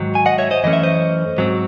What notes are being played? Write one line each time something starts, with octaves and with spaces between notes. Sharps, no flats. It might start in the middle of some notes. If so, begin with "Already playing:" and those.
Already playing: G#2 D#3 F#3
G#5
D#5 F#5
C#5 E5
C5 D#5
F#2 E3 A3 C#4 D#5
E5
C5 D#5
G#2 F#3 C4